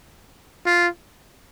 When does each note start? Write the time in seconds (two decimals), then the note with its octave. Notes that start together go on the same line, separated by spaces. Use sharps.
0.66 F4